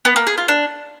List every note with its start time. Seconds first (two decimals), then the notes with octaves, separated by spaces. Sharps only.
0.05 B3
0.16 A#3
0.27 G#4
0.38 F4
0.48 D4